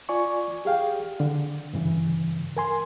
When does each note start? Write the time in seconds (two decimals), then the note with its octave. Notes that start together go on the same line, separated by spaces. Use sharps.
0.09 F4 D5 G#5 C#6
0.65 G4 G#4 F5 G5
1.20 D3
1.74 G2 C#3 E3
2.57 A#4 G#5 C6